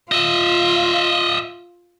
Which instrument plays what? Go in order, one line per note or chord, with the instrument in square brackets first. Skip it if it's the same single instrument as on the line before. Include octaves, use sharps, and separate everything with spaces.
[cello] F4 [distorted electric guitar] D#5 E5